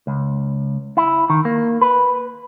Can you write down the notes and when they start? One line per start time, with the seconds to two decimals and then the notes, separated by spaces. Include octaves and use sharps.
0.07 C#2
0.97 E4
1.30 D#3
1.45 A#3
1.81 B4